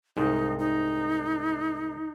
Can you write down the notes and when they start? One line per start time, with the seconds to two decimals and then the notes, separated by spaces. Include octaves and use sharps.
0.17 C2 G#2 D#4
0.59 D#4